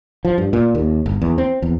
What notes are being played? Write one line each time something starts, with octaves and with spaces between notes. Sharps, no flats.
F3
G2
A#2
D#2
G1
E2
C4
E2